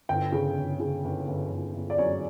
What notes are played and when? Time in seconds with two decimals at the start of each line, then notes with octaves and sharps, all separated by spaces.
0.09 G1 G5
0.32 C#3
0.57 G1
0.80 C#3
1.04 G1
1.28 G1
1.51 G1
1.74 G1
1.90 D5
1.98 F#2 C#5